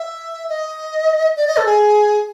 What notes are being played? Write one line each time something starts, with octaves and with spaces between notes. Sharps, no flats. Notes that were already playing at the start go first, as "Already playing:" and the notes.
Already playing: E5
D#5
D5
D#5
A4
G#4